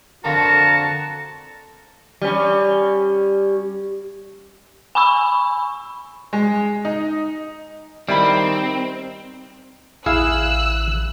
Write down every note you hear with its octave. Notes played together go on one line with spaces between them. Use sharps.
F2 D3 F3 F#4 A#4 A5
G3 C#4
G#5 B5 C#6 E6
G#3
D#4
D#3 G3 C4 E4 B5
A1 E4 G#4 F5 E6 F#6